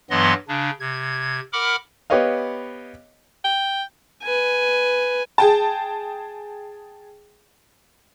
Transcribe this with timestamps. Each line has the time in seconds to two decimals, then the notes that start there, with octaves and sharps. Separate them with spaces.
0.10 G2 E3 F#3 B3 D#5 C6
0.49 C#3 D4
0.80 C3 G#6
1.53 A#4 F#5 B5 D6 F6
2.10 B3 G4 B4 C#5 D#5 F5
3.44 G5
4.23 B4 G#5
5.38 G#4 G5 A5